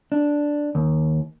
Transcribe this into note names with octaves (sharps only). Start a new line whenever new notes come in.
D4
D#2